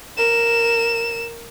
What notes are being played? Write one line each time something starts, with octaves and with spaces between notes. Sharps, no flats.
A#4 E7